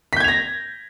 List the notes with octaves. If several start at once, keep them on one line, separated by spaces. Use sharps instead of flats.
G6 G#6 A#6 B6 F7